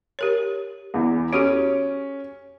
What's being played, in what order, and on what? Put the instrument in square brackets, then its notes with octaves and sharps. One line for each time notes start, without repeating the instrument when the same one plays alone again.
[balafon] G4 A#4 C#5
[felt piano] E2 E3
[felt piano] C#4 [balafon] F#4 G4 A4